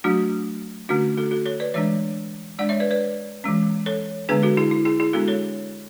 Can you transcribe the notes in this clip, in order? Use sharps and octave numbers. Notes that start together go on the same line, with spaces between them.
F#3 A3 D4 F#4
D3 A3 C#4 D4 F#4
F#4 A4
F#4 A4
A4 C#5
B4 D5
E3 G#3 D4 C#5 E5
G#3 D4 D5 F#5
C#5 E5
B4 D5
B4 D5
E3 G#3 C#4
A4 C#5
D3 G#3 B3 D4 G#4 B4
F#4 A4
E4 G#4
E4
E4 G#4
E4 G#4
G#3 B3 D4 F#4 A4
A4 C#5